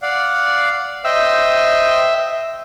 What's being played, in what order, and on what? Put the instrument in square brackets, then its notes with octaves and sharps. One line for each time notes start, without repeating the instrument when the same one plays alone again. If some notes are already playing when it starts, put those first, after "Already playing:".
[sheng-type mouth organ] D5 F5 F#5
[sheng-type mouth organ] C5 D#5 G5 [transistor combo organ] E5